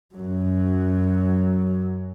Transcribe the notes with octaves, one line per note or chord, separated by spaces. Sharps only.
F#2 F#3